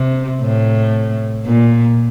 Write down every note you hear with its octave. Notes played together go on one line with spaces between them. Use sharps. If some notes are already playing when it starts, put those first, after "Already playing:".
Already playing: C3
A2
A#2